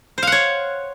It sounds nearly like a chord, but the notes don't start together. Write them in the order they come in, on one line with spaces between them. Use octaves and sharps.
C5 F5 F#5 C#5